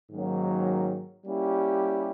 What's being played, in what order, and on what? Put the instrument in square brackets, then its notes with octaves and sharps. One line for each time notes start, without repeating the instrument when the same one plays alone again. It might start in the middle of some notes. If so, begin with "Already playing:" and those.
[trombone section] G#2 D#3 F#3 A#3 C#4
G3 A#3 C#4 E4 G4